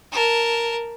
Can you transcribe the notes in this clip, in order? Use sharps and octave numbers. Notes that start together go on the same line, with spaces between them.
A#4 A5